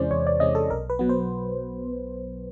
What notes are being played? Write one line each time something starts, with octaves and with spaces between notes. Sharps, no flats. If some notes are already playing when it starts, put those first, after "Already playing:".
Already playing: E2 C3 E3 G#3 C#4 C5 D5
E2 C#5
D5
C3 E3 G#3 C#4 D#5
A4
B1 A#4
B4
B2 F#3 B3
C5